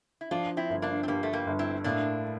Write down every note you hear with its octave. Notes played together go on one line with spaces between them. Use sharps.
E4
F3 D4 F4
C4 E4
G1
A#3 D4
C4
G2 G3 A#3
A3
G3 A#3
G1
C4 E4
A2 A#3 D4